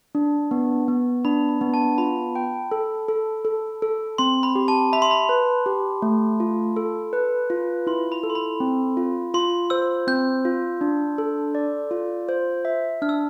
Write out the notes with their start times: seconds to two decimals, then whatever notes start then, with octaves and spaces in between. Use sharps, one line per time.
0.15 D4
0.51 B3
0.88 B3
1.25 D4 B5
1.49 B5
1.61 B3
1.74 A5
1.98 F4 B5
2.35 G5
2.71 A4
3.09 A4
3.45 A4
3.82 A4
4.18 C4 C6
4.43 B5
4.55 G4
4.68 A5
4.93 E5 B5
5.02 C6
5.11 B5
5.29 B4
5.66 G4
6.02 A3
6.40 F4
6.76 A4
7.13 B4
7.50 F4
7.87 E4 C6
8.12 B5
8.23 A4
8.30 C6
8.35 B5
8.60 C4
8.97 F4
9.34 F4 C6
9.70 C5 E6
10.07 C4 G6
10.45 F4
10.81 D4
11.18 A4
11.55 D5
11.91 F4
12.29 C5
12.65 E5
13.02 D4 F6
13.09 E6